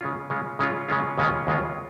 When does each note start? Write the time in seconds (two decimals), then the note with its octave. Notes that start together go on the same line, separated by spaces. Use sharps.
0.01 C#3 G#3 C#4 F4
0.30 C#3 G#3 C#4 F4
0.59 C#3 G#3 C#4 F4
0.88 C#3 G#3 C#4 F4
1.18 D#2 C#3 G#3 C#4 F4
1.47 D#2 C#3 G#3 C#4 F4